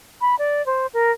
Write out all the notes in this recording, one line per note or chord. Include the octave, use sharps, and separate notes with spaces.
B5
D5
C5
A#4